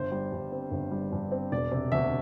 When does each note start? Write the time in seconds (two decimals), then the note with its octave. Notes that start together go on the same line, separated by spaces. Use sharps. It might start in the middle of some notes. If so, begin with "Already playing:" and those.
Already playing: G1 C5
0.12 G3
0.32 G2
0.52 C4
0.71 G1
0.91 G3
1.12 G2
1.32 C4
1.52 E1 D5
1.71 C3
1.92 D2 E5